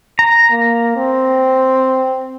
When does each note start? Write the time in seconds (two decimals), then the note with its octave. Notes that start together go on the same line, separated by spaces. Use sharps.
0.19 A#5
0.51 A#3
0.96 C4